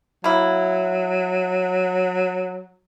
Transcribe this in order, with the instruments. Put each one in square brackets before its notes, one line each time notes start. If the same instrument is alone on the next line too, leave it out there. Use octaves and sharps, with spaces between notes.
[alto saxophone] F#3 [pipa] A#3 E4